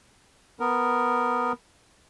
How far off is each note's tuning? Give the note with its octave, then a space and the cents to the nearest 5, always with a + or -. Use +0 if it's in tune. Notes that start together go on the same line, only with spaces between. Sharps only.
B3 +0 A#4 +0